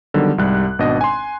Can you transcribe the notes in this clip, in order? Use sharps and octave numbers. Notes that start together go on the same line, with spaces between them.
D3 D#3 F#3 G3 B3
C2 G#2 G3 F#6
G#1 B2 D4 D#5
G#5 C6